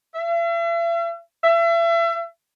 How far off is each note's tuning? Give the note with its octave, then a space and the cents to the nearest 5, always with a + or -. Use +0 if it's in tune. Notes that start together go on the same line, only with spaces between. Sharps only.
E5 +45
E5 +35